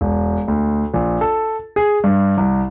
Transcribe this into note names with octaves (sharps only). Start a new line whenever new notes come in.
E1
D2
A#1
A4
G#4
G2
C2